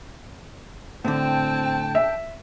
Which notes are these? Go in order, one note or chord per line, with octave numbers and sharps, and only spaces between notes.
A2 D3 C4 G5 A5
E5